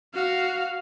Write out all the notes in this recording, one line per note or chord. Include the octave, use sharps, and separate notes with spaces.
F#4 F5